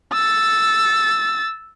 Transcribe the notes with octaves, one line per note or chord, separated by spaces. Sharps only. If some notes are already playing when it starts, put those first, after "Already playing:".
E6 A6